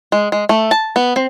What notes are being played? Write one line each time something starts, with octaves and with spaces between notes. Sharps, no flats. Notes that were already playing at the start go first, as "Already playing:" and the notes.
G#3
G#3
A3
A5
B3
C4